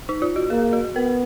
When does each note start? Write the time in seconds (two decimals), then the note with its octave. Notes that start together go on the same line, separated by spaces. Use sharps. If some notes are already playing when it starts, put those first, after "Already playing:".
0.09 D#4
0.22 F4
0.36 F#4
0.50 A#3 G#4
0.73 F#4
0.95 B3 A#4